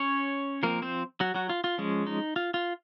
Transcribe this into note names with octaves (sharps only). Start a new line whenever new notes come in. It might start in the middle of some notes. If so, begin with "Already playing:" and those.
Already playing: C#4 C#5
F3 A#3 C4 A#4
C4 C5
F#3 F#4
F#3 F#4
F4
F4
F3 G#3 C#4
D#4
F4
F4